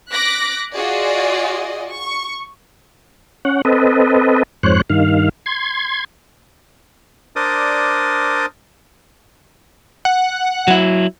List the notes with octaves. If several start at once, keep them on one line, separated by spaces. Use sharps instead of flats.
D6 F#6 A#6 B6
F4 F#4 G#4 D5 D#5
C#6
C#4 F#5
C4 A4 B4 D#5
F2 G#2 C5 C#5 F#6
G2 D#3 F5
C6 G#6
D4 A#4 C5 D5 D#6
F#5
F#3 E4